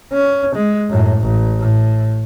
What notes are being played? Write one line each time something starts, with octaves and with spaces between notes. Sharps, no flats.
C#4
G#3
F#2 A2
A1
A2